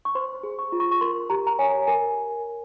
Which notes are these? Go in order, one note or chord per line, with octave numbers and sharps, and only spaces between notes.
C#6
C5 C6
G#4
C#6
F4
C#6
C#6
A#4 C6
G4 A#5
A#5
C#5 G#5
A#4 G#5